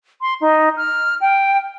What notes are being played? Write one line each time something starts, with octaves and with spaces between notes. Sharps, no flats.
C6
D#4
F6
G5